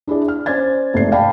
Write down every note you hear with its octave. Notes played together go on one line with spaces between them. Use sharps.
D4 E4 G#4 D5
F6
C#4 C5 D5 G#6 A6
F1 G#2 A3 C7
D5 F5 G5 A5 B5